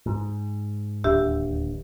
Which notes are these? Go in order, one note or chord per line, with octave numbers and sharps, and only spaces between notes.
G#2
D1 D#2 D4 G4 E5 E6